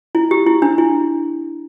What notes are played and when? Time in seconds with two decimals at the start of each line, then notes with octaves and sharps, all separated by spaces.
0.15 E4
0.31 G4
0.47 E4
0.62 D4
0.78 E4